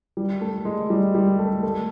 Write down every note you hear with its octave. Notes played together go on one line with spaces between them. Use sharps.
G3
A3
G#3
G3
G3
A3
A3